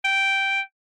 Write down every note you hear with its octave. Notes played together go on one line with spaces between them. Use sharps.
G5